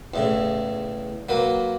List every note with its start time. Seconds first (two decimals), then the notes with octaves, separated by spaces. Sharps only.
0.14 E2 A2 C#3
1.29 F#3 A#3 B4